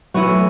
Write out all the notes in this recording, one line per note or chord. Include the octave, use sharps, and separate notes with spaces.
E3 F#3 B3 F#4
A3